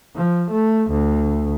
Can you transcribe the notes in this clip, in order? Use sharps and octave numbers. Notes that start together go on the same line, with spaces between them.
F3
A3
D2